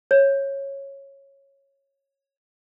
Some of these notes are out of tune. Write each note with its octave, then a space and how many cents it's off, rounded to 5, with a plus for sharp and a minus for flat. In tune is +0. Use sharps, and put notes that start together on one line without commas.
C#5 -10